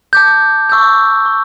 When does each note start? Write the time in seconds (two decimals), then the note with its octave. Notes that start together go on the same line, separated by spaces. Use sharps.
0.13 A5 D6 G6
0.69 C#6 E6 G6
1.26 C#6